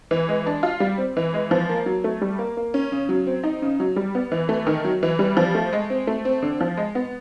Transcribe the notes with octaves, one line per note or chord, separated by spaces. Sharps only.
E3
G#3
D4
F4
G3
C4
E3
G#3
F3
A#3
F#3
A3
G3
A#3
A#3
C#4
C#3
F#3
C4
D#4
C#3
F#3
G3
B3
E3
A3
D#3
F#3
E3
G3
F3
A3
G#3
C4
A3
C4
D3
F3
G#3
B3